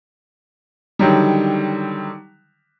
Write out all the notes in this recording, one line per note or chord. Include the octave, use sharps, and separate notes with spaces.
D3 D#3 F#3 G3